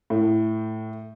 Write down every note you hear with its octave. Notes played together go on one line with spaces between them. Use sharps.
A2